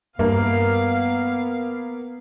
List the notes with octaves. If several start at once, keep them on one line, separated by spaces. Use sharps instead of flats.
G2 A#3 B3 F5